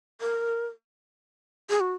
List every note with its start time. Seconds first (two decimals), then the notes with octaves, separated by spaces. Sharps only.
0.21 A#4
1.70 G#4
1.80 F#4